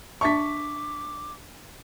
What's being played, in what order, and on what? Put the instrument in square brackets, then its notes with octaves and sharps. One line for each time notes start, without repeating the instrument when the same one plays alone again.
[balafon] D4 E5 A5 [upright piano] C#6 B6 [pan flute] D6